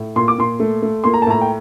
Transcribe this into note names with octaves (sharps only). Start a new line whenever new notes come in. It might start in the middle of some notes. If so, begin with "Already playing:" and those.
Already playing: A2
A#2 C6
D6
A#2 C6
A3
A3
A#3 C6
A#5
A5
A2 A#5
G5